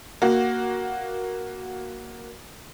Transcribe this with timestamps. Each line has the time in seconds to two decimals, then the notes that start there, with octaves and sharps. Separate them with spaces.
0.22 A#3 F#4